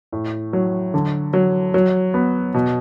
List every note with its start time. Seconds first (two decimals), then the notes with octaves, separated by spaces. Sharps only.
0.12 A2
0.53 F#3
0.94 D3
1.33 F#3
1.74 F#3
2.14 B3
2.54 B2